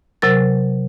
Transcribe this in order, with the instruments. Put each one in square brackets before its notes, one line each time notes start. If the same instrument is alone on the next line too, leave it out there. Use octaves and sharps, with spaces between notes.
[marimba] C3 F#3 A#4 A6